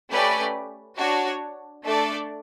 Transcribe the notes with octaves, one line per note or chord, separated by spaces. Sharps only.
A3 C#4 G4 B4 D5
D4 F#4 C#5
A3 D4 A4 D5